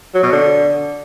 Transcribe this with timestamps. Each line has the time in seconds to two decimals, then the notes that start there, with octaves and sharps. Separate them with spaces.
0.14 F#3
0.23 B2
0.32 D3